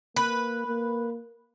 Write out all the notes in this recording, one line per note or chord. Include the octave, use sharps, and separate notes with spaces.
A#3 B4
A#3